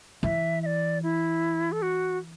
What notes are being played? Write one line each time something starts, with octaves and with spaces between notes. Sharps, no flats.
E3 E5
E5
D5
E4
A4
F#4